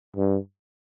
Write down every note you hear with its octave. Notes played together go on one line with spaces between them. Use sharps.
G2